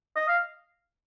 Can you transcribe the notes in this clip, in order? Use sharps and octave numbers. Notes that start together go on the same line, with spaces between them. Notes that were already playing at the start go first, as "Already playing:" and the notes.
D#5
F5